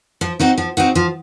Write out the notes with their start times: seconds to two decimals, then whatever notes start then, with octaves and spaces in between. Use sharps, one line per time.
0.21 F3
0.39 C4 D#4 F#4
0.58 F3
0.77 C4 D#4 F#4
0.95 F3